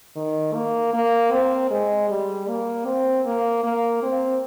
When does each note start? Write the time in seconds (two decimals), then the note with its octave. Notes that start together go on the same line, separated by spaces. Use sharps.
0.16 D#3
0.54 A#3
0.93 A#3
1.32 C4
1.71 G#3
2.10 G3
2.48 A#3
2.86 C4
3.26 A#3
3.64 A#3
4.03 C4